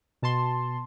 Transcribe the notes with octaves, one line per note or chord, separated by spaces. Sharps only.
B2 A5 C6